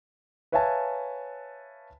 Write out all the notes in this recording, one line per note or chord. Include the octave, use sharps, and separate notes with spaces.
B4 C#5 E5 F5 G#5 A5